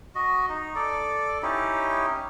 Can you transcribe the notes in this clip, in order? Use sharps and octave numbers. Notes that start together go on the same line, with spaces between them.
F#4 D#5
D#4
A4 D5
C#4 D#4 E4 G4